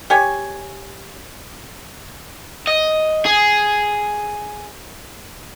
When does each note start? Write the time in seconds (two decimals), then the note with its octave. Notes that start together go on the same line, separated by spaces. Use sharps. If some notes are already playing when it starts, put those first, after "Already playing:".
0.10 G4 C#5 G#5
2.67 D#5
3.26 G#4